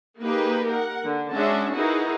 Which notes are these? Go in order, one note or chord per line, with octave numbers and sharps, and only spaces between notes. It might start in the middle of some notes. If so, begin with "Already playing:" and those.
A#3 D#4 G4 G#4 B4
A#4 F#5
D3
G#3 C#4 D4 F#4 E5 A5
D#4 E4 F#4 G#4 A#4 B4